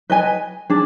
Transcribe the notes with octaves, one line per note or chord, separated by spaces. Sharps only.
B4 D#5 G#5
D4 G#4